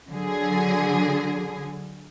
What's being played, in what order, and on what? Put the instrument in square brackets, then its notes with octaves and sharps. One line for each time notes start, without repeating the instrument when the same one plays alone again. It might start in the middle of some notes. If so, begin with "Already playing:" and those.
[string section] D3 F#3 G#4